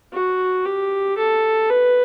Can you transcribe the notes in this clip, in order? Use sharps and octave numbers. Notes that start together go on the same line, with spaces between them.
F#4
G4
A4
B4